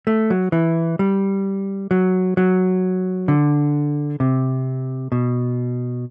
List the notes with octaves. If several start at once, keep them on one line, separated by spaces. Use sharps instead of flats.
A3
F#3
E3
G3
F#3
F#3
D3
C3
B2